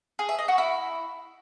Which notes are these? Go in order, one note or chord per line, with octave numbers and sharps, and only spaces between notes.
G#4
E5
D#5
F#4
E4